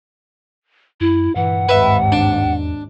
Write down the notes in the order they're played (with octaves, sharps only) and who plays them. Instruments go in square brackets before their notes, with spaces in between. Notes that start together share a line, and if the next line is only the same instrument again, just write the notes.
[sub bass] F#2 [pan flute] E4
[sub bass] G2 [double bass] A#2 E3 [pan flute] F#5
[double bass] G#1 D#2 [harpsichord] B4 E5
[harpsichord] D4
[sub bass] E2